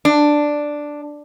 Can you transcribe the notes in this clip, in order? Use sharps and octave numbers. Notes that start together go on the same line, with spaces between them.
D4